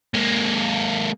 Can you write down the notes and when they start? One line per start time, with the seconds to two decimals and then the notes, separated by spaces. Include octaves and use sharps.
0.14 G#3 A#3